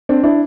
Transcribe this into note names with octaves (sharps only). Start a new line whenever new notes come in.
C4 D4
D4 E4